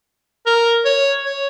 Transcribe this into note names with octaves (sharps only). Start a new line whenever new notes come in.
A#4
C#5
C#5